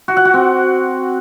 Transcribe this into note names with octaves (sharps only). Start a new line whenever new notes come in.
F#4
F#5
F#4
C4